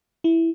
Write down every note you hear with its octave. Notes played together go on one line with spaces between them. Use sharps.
E4